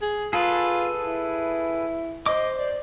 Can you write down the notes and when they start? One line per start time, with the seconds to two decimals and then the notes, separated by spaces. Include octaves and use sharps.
0.02 G#4
0.33 F4 G#4 A4 B4
1.04 E4
2.26 C5 D#5 D6
2.57 D5